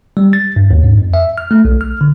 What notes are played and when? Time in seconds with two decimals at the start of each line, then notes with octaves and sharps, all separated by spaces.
0.17 G3
0.33 A6
0.56 G2
0.71 D#2
0.83 G#2
0.97 F2
1.14 E5
1.38 F6
1.51 A3
1.65 B1
1.81 F6
2.01 D3